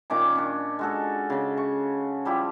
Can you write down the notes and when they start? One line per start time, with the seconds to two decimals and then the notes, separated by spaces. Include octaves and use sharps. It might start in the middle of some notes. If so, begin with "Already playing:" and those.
0.10 A#2 D#3 C#4 D6
0.35 C#4 D4
0.79 G#3 F#4 A4
1.30 C#3 C#4
1.57 C#6
2.25 F3 G3 E4 G4